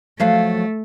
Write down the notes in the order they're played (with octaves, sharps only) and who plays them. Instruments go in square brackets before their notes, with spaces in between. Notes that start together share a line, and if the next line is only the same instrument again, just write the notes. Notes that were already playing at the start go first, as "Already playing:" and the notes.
[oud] F3 F#3 F5 [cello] A3